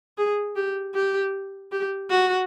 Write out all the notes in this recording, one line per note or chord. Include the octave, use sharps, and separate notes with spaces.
G#4
G4
G4
G4
F#4